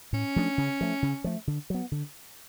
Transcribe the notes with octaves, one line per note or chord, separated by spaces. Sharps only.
A2 C#4
F3 A3 D4
C#3
F3 A3
C#3
F3 A3
D3
F#3 B3
D3